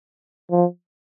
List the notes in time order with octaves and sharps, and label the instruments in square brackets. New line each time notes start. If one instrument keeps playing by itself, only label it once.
[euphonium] F3